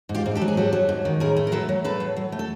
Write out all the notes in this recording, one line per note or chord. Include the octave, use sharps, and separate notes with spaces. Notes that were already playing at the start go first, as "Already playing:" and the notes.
G#2
F4 G4
G#2
G4 A4
F#3
G#4
F#3 G4 A4
F#3
G#2
D#3
A2 G#4 A#4
A3
A#4
F#3 A4 B4
F#3
A2 A4 B4
F#3
F#3
A3
A4